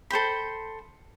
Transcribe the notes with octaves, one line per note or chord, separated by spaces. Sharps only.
A4 C5 G5 B5